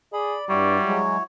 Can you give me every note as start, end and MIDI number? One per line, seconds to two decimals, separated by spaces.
0.13 0.36 68
0.13 1.02 74
0.13 0.45 83
0.49 0.77 43
0.49 0.99 55
0.49 1.23 64
0.49 1.23 66
0.49 1.23 73
0.84 1.17 54
0.84 1.17 56